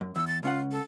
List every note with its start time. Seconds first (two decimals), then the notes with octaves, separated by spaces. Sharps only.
0.01 F#2
0.16 E2 E6
0.27 A6
0.43 C#2 C#4 F4 F#5
0.71 A4